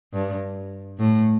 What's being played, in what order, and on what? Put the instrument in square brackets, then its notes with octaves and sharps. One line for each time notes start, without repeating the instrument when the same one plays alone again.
[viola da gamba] G2
A2